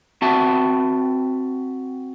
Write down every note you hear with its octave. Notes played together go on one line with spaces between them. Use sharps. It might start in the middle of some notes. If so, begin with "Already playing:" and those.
C4 F#4 E5 A5